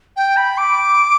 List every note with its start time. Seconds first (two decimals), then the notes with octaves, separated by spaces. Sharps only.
0.16 G5
0.37 B5
0.57 D6